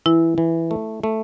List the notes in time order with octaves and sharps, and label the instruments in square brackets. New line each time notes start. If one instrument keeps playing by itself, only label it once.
[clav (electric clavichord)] E3 [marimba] E4
[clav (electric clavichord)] E3
A3
A3